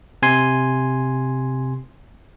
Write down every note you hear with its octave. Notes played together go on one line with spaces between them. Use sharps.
C3 G#5 C6